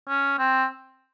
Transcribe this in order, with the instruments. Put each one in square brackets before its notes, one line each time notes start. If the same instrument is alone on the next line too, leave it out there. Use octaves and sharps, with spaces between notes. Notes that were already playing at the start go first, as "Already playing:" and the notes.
[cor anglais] C#4
C4